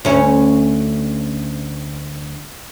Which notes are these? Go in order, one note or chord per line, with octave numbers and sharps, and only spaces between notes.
D2 C#4